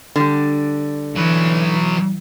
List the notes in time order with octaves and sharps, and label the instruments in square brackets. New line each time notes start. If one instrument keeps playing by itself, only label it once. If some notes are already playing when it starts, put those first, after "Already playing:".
[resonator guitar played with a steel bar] D3 G3
[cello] E3 [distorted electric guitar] F#3 B4